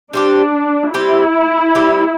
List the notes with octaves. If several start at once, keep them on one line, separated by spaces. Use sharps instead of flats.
G3 C4 D4 G4
G3 C4 E4 G4
G3 C4 G4